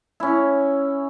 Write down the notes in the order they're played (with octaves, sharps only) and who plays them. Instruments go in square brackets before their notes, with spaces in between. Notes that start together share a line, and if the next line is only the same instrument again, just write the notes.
[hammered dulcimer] C#4 E4